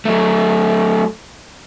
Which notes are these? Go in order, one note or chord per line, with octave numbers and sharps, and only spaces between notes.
F#3 A3